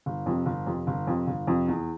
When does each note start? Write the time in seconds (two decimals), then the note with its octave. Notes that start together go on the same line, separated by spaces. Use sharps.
0.06 G1
0.26 F2 C3
0.46 G1
0.67 F2 C3
0.87 G1
1.07 F2 C3
1.27 G1
1.47 F2 C3
1.68 E2